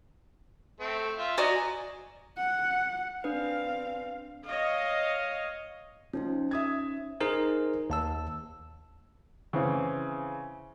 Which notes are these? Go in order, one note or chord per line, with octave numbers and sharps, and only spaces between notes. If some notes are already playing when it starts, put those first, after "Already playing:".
A3 C4
F4 E5
F#4 D5 D#5 G#5 A#5
F#5
C4 D4 B4 F5
C#5 D#5 F5
F3 C#4 D#4 C5
E5 D#6 G#6
D#4 G#4 A#4 C5
D#2 A5 E6
C#3 E3 C4